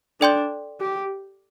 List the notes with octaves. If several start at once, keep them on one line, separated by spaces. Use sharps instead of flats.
D4 A4 D5 G5 C6 G6
G4